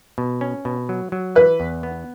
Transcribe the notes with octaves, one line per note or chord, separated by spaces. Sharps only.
B2
C#4
B2
F#3
F#3
E3 B4
E2
B3